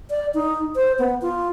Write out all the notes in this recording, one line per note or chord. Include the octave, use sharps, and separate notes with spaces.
D5
D#4
C5
B3
F4